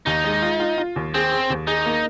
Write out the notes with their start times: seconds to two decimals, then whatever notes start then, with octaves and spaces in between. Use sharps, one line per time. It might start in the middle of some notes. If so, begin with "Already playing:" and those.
0.06 D#2 D#4
0.24 G#3
0.42 F4
0.60 F4
0.78 F4
0.96 D#2
1.14 C4 G#4
1.31 G#4
1.50 D#2
1.67 D#4 G#4
1.86 A#3